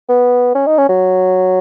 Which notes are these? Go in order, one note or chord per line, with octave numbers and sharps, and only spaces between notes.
B3
C#4
D#4
C#4
F#3